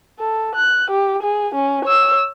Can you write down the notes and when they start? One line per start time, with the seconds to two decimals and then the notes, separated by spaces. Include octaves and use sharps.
0.19 A4
0.55 F#6
0.90 G4
1.23 G#4
1.54 C#4
1.85 C#5 E6